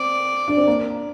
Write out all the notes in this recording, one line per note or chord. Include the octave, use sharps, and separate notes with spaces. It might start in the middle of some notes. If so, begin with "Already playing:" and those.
Already playing: C4 D5
D4
C4
A#3